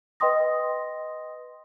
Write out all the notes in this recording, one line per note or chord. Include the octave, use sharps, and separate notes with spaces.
B4 D#5 G5 C6 D#6 A#6